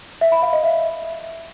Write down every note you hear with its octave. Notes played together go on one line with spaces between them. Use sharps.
E5
B5
F5
D#5
E5